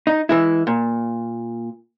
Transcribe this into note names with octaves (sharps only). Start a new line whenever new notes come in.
D#4
E3 G#3 E4
A#2